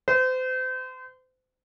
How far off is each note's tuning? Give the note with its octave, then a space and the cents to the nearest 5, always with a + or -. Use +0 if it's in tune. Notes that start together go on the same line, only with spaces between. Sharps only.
C5 -35